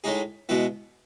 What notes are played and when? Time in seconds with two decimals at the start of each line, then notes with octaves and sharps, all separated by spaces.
0.04 A2 G#3 D#4 G#4
0.49 B2 G#3 B3 E4